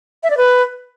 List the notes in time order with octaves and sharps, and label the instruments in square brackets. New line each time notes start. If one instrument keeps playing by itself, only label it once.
[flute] E5
D5
B4